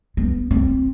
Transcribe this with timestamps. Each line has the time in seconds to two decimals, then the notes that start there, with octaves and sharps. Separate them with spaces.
0.17 B3
0.51 C4